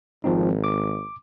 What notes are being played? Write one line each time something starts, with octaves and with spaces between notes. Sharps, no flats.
G#1 F3 C4 D#4
D6